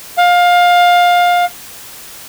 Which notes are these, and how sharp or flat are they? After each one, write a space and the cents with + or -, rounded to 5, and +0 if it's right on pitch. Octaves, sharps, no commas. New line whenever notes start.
F5 +20